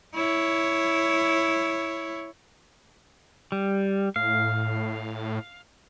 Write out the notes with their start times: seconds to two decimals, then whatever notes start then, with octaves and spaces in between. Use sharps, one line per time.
0.15 E4 C#5
3.52 G3
4.16 A2 F5